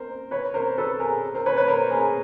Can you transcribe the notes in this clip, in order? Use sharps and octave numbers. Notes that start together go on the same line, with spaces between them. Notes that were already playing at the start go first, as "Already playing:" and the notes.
Already playing: A#4 C5
B4 C#5
A#4 C5
A4 B4
G#4 A#4
A#4 C5
B4 C#5
B4 C#5
A#4 C5
G#4 A#4